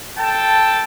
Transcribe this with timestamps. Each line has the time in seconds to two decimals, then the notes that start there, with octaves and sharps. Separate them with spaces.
0.18 A4 G5 A5